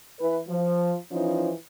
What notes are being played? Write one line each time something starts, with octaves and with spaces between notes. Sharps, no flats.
E3 B4
F3
E3 F3 C#4 D#4 F4 C5